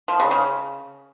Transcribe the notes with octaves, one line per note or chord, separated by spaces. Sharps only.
F3
C#3
C#3